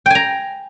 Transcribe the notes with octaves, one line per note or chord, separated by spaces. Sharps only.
G5 G#5 A#5